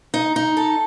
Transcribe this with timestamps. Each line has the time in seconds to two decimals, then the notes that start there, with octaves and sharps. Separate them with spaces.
0.14 D#4
0.36 D#4
0.57 A4